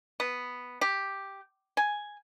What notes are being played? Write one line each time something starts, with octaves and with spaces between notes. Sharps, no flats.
B3
G4
G#5